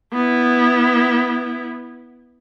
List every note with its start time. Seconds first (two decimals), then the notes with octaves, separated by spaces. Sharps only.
0.13 B3 E4